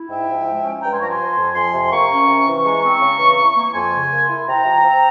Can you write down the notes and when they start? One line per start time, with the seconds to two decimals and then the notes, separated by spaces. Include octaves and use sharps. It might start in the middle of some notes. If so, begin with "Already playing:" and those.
Already playing: E4
0.09 G#2 E5 G5
0.27 F3
0.46 G#3
0.64 C#4
0.82 G2 G5 A#5
0.92 G#5 C6
1.00 F3 A#5 C#6
1.09 G#5 C6
1.19 F3
1.37 F2
1.55 F2 G#5 C6
1.74 C3
1.91 A#3 A#5 C#6
2.11 C#4
2.28 C3
2.46 E3
2.65 G#3 A#5 C#6
2.83 C4
3.01 C#3
3.19 E3
3.38 E3
3.56 A#3
3.64 C#6
3.74 F2 G#5 C6
3.93 C#3
4.11 A#3
4.28 E4
4.48 C3 G5 A#5
4.65 F3
4.83 C4